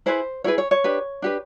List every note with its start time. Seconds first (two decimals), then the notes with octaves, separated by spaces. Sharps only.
0.06 E4 G#4 B4 C5
0.44 E4 G#4 B4 C#5
0.58 C#5
0.71 C#5
0.84 D4 G4 B4
1.22 D4 G4 B4